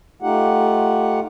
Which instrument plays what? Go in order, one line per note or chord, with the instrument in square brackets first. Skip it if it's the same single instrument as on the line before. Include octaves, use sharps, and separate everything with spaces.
[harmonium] A3 D#4 F4 G4 F#5